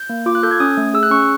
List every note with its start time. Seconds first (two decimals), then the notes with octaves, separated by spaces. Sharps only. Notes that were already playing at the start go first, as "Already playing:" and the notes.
Already playing: G6
0.09 A#3
0.26 F4 D6
0.35 F#6
0.43 A4 G6
0.51 G#6
0.60 C#4 D#6
0.77 A3
0.94 G#4 E6
1.03 F#6
1.11 C#4 C#6